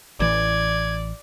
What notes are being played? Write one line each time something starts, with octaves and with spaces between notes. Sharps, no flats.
A1 E3 D5 G#6